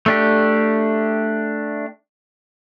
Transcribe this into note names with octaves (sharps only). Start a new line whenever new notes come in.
A3 D4 G4